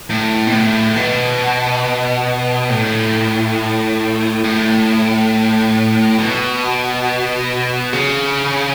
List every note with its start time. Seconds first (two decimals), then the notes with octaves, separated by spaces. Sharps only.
0.10 A2
0.47 B2
0.52 A2
0.96 B2
2.69 A2
4.44 A2
6.18 B2
7.93 C#3